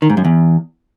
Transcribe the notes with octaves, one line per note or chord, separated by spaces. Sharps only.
D#3
G#2
F#2
E2